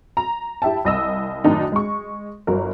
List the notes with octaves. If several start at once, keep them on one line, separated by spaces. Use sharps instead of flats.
A#5
E4 G4 E5 G5 A5
C2 D#5 E6
F#2 A2 D#3 D4 D#4
G#3 C#6
G1 F#3 A#4